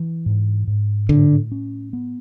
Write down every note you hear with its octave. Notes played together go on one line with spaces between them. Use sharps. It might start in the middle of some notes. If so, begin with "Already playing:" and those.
Already playing: E3
G#2
G#2
A2 D3
C#4
B3